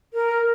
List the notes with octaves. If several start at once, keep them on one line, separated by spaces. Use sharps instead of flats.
A#4